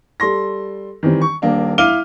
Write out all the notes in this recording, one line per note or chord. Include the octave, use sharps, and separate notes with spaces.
G3 A4 C6 A#6
D#3 E3 G3 C4
C#6
D#1 A#3 D4
E4 F5 D6 F6 D#7 G7